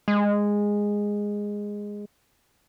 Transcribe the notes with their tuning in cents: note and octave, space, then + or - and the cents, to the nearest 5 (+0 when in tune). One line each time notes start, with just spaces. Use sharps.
G#3 -10